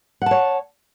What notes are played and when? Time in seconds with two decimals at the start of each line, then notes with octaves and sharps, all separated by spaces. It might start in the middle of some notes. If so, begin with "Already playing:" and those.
0.22 F#5
0.26 A5
0.31 C#5